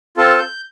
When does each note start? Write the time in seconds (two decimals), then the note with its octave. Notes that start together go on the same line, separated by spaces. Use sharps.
0.17 C4 F4 A4 A5
0.39 G6